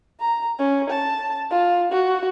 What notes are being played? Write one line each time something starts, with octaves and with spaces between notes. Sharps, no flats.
A#5
C#4
A5
F4
F#4